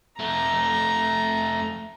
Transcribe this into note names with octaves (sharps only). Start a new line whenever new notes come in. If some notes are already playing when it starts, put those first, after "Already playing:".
F2 A3 A#5